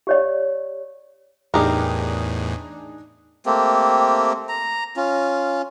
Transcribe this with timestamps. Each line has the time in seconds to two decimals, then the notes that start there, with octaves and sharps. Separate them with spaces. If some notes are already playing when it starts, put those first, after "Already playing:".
0.07 G4 C#5 D5
1.54 E2 A2 D4 D#4 G4 G#4 A#4
3.46 A3 A#3 C4 G4
4.49 A#5
4.97 C#4 F4